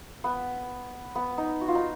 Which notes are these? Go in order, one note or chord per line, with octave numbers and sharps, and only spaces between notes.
B3
B3
D#4
F#4
F4
D#4